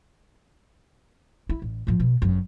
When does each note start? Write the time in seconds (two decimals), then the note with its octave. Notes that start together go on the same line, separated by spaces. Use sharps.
1.49 E4
1.62 A1
1.87 A2 F3
2.00 B2
2.22 G1 F#2